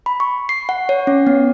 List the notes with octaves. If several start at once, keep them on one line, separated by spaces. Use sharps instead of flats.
B5
C#6
C7
F#5
C#5
C#4
B3